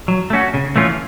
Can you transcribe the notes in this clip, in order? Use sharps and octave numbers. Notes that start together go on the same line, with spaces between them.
F#3
A3 C#4 F#4
C#3
E3 A3 C#4 F4